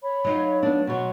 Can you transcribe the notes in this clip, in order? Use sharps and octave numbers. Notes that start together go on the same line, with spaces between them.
C#5 B5
F#3 D#4 F4
B3 D4
B2 F#3 F#5 C6 C#6